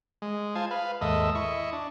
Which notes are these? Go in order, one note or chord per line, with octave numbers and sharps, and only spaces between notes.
G#3
F4 C5 G#5 A5
B4 F5
D#2 G#2 A4 D#5 E5
E4 D#5 C#6
D4